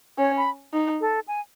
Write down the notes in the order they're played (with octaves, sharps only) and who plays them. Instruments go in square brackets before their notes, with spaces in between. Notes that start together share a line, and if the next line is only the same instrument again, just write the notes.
[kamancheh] C#4 [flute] C#5
[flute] B5
[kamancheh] D#4
[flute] A4
G#5